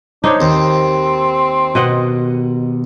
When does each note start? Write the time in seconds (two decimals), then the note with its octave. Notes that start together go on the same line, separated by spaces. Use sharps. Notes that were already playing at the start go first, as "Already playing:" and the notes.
0.24 D4 D#4 C5 C#5
0.41 D#2 C4
1.75 B2 D#5 F#5